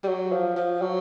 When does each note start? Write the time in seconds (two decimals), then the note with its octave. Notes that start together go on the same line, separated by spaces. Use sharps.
0.03 G3
0.08 F#3
0.32 F3
0.57 F3
0.82 F#3